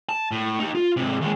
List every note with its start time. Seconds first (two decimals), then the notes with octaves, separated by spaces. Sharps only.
0.09 A5
0.31 A2
0.59 D#4 G4
0.75 F4
0.97 G#2 C3
1.21 D#2 G#3